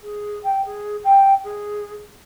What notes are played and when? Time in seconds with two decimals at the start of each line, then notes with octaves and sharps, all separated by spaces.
0.01 G#4
0.43 G5
0.65 G#4
1.04 G5
1.44 G#4